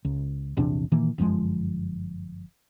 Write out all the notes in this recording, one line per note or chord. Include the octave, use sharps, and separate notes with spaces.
C#2
A#1 E2 C3 D4
A#2 D#3 E3 A#3
G1 F#2 F3 G#3